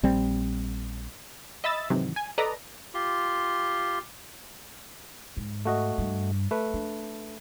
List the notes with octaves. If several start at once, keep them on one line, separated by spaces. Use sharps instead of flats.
A#1 G3 C4
D#5 E5 B5 E6 A6
G#2 C3 D#3 E3 F#3
G#5
A4 B4 D5 D#5 A#5
F4 G4 C6
G#2
A3 F#4 D#5
G2
A3 B4
D4